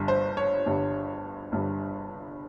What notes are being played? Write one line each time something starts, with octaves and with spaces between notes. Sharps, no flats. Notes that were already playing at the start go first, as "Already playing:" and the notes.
Already playing: G1 G2 G3
C5
C#5
G1 G2 G3
G1 G2 G3